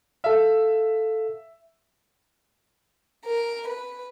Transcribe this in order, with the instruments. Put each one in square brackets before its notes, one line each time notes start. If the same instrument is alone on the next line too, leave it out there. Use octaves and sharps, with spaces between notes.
[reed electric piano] A4 F5 [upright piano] E5
[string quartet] A#4
B4